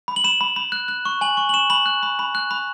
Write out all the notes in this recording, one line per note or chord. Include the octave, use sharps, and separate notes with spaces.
B5
F#7
B5 E7
B5
B5
F#6
F#6
C#6
G#5 F#7
C#6
F#7
C#6 E7
B5 F#7
F#6
B5
B5
F#6
B5